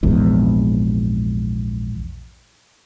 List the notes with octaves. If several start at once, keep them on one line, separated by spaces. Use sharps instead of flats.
A#1 E2 G#2